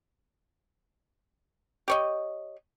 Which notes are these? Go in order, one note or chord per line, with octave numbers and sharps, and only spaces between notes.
G4 C#5 D#5